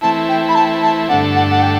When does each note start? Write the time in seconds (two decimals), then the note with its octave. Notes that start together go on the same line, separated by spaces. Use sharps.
0.01 E3 A3 C4 E4 A5
0.29 G5
0.49 B5
0.55 A5
0.82 A5
1.09 G2 D3 A3 D4 A4 F#5
1.35 F#5
1.50 F#5
1.62 G5